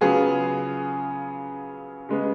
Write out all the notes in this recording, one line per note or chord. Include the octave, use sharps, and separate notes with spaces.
C#3 F#3 B3 F4 G#4
C#3 G#3 B3